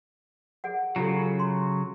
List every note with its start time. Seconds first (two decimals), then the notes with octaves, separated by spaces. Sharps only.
0.64 G#4 D5 F#5
0.96 C#3 F#3 F4 G4 A4
1.39 C6